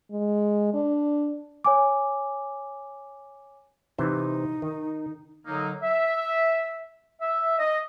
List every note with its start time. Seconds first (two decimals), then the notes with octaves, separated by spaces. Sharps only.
0.11 G#3
0.74 D4
1.64 C#5 G#5 D6
3.98 C3 E3 D#4 C5
4.62 D#3
5.46 D3 F#3 A#3 D#4
5.83 E5
7.21 E5
7.59 D#5